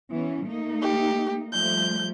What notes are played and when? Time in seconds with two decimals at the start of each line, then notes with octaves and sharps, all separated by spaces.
0.12 E3 B3 C#4
0.44 A3 A#3 D#4
0.82 G4
1.53 F3 G3 A3 G6